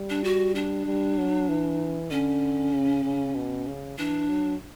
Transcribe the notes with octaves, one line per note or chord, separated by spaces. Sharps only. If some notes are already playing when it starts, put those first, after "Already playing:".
Already playing: G3
D4
F#4
D4
G3
F#3
E3
D3 C#4
C#3
C#3
B2
C#3
E3 D4
F#3